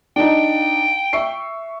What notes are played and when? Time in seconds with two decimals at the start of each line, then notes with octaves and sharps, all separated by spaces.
0.16 D4 D#4 G5
1.13 E5 C#6 C7